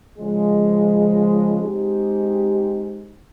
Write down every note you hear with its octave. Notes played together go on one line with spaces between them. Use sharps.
C#3 F3 G#3
G#3 C4 D#4 G4